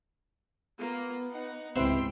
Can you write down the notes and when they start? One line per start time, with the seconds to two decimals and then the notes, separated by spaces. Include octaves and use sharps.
0.79 A#3 B3 F4
1.31 D#4 F#5
1.76 C#2 G#2 C3 B3 E4 C5 G5 C6